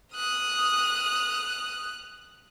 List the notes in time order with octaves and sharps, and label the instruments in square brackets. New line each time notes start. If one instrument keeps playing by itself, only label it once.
[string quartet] D#6 [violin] F6 F#6